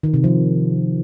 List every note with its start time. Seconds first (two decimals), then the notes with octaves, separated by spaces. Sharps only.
0.03 D#3
0.14 C3
0.24 F3